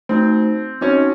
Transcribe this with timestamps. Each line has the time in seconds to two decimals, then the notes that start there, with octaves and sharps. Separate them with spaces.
0.09 A3 C4 D#4 F#4 C5
0.81 C4 C#4 D#4 F#4